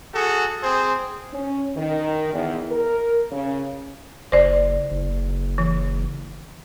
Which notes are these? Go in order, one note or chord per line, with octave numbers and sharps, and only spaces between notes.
F#4 G#4 A4
C4 G#4 C5
C#4
D#3
E2
A#4
C#3
F#1 C5 D5
F#1
E3